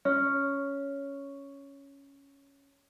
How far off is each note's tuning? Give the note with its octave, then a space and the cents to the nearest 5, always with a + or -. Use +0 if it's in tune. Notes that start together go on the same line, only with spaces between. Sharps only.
C#4 +5